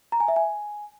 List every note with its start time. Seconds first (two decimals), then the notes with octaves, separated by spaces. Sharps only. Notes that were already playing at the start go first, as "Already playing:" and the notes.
0.12 A#5
0.20 G#5
0.28 E5
0.36 G#5